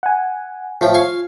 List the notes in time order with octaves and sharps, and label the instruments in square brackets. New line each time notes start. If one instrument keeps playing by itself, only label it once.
[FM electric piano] F#5 G#5
[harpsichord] A2 F3 G5 [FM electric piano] F4
[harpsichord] F5 G#5 C#6